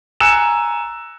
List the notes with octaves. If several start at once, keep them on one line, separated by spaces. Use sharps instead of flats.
G#5 A#5 E6 F#6 C#7 E7